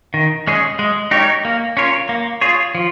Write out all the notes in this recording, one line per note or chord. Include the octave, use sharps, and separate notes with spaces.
D#3
G#3 C#4 G#4
G#3
D#4 G4 A#4 C#5
A#3
C#4 F4 A#4 C#5
A#3
F4 G#4 C#5
F3